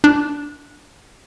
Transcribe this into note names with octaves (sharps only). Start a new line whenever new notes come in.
D4